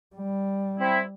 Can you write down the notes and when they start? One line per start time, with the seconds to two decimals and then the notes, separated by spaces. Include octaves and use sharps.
0.16 G3
0.79 C4 E4